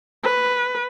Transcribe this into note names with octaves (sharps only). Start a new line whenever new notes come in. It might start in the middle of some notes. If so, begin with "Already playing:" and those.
B4